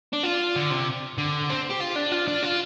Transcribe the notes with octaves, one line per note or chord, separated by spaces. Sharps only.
D4
F4
D3
C3
D3
C4
G4
F4
D4
F4
D4
F4